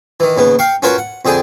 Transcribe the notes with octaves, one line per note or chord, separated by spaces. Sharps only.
D#3 E3
D#2 C#3 B3
F5 G5 C#6
C#4 F4 F#4 A#4 B4 C#5
F#5
F2 D3 G#4 G5 G#5